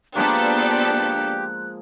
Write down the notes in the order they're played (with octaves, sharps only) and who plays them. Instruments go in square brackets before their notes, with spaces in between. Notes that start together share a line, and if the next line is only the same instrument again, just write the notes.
[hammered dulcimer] F3 G#3 A#3 [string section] B3 D4 A4 [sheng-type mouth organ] G4 [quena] F#6